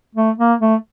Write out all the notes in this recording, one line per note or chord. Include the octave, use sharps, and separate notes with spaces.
A3
A#3
A3